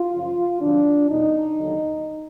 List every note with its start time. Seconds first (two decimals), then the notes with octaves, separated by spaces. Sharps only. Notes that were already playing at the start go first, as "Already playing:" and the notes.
Already playing: F4
0.13 F#2 C#3 F3
0.61 F2 C3 D#3 F#3 D4
1.10 E2 B2 G3 D#4
1.59 D#2 D3 F#3